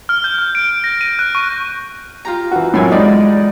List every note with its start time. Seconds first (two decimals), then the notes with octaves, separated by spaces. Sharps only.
0.09 F6
0.24 G6
0.39 F6
0.55 D7
0.84 A#6
1.01 D#7
1.19 F#6
1.35 C#6
2.25 F4 G4 A#5
2.51 E3 F#4
2.74 F#2 A2 A4 D5 G#5
2.91 E2 G#3 D#4 D5